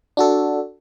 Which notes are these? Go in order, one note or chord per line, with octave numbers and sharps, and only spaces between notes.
D4 F#4 A4